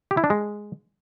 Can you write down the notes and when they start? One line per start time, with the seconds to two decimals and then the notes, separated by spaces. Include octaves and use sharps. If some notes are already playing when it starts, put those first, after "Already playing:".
0.11 G4
0.17 E4
0.24 D4
0.30 G#3